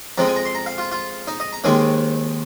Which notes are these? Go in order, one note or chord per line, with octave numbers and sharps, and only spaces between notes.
F2 F3 G#3 C4 A#5
G#5
A#5
C6
A#5
F5
F4
F4
D#4
D#5
A#5
D#2 D#3 G#3 C4 G#5